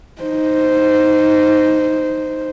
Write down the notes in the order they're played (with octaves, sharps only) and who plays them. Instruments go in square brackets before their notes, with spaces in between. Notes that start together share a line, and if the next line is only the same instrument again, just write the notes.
[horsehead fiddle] D#4 C5